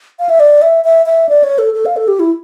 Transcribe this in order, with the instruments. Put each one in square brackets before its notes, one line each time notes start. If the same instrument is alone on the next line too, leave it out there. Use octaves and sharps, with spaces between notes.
[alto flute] F5
E5
D5
E5
E5
E5
D5
C#5
A4
A4
F5
A4
G4
E4